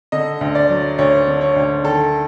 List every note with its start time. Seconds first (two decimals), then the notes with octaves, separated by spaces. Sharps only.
0.12 D3 D#5
0.41 D2
0.55 D5
0.70 F#3
0.98 D2 C#5
1.27 D3
1.41 C#5
1.56 D2
1.84 D#3 A4